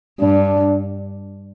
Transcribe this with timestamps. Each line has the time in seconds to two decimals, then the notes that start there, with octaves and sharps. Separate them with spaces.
0.20 G2 D4